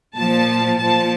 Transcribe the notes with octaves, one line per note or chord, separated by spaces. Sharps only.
A#2 F3 A5
A#2 F3 A5